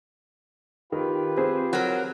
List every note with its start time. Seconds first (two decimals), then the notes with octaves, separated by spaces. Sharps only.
0.92 D#3 F4 G4 B4
1.37 C4 G#4 C5
1.73 F#3 A#4